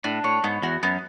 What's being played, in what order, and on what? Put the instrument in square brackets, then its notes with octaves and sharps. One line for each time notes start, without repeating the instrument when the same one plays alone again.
[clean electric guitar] A2 [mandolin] D4
[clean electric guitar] A2 [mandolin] C#5
[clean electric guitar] G#2 [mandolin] B3
[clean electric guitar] E2 [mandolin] F#4
[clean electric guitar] F#2 [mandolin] B3